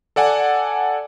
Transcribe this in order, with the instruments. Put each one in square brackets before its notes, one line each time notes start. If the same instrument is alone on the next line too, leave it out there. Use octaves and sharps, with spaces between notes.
[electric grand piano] A4 D5 F#5 G#5